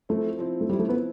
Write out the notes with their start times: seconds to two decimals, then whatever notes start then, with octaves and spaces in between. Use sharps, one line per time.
0.09 F3 A3 C4 E4
0.39 F3 C4 E4
0.61 A3
0.69 F3 G3 C4 E4
0.79 A3
0.89 B3